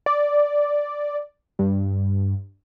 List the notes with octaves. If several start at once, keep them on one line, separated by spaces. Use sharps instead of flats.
D5
G2